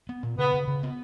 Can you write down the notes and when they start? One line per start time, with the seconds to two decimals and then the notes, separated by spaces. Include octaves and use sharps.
0.09 B3
0.23 A#2
0.38 C#3 B3
0.54 C#3
0.68 C#3
0.83 B3